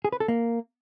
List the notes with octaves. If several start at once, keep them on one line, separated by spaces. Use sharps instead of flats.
G#4
B4
A4
A#3